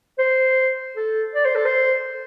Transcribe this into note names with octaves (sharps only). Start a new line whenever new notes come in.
C5
A4
D5
C5
A4
C5